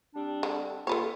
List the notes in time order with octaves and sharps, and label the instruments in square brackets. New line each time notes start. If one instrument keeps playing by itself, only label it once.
[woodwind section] G3 C4 D4
[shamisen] D3
[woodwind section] D2 A#3 F4 [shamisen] A4 B4 C#5